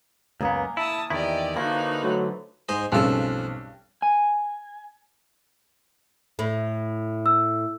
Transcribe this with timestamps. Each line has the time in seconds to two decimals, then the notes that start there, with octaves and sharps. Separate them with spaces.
0.41 C#2 F#2 A#3 B3 G#4 A#5
0.77 E4 A5 D#6 E6
1.10 E2 D#3 E4 G4 D5 D#5
1.56 D3 E3 F3 A#3 D#4 F#4 B5 F#6
2.03 D3 F#3 A3
2.69 G#2 C5 D#5
2.92 B1 G2 C#3 F3 C4 C#4 A4
4.02 G#5
6.39 A2
7.26 E6